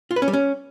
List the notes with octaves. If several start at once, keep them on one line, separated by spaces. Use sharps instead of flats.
F4
B4
C#4
G3
C#4